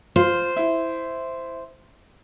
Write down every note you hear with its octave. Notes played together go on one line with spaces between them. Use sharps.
F4 C5
E4